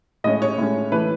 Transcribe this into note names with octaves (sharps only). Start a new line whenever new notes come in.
A2 G#3 C#4 D#5
C#5
A2 G#3 C#4
E3 A3 B4